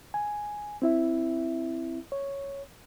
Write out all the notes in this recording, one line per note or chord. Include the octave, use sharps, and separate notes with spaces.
G#5
C4 E4 E5
C#5